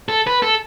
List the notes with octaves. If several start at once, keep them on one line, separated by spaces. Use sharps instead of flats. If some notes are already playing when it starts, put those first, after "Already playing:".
A4
B4
A4